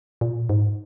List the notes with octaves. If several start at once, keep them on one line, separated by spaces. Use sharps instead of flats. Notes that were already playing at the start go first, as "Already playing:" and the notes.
A#2
G#2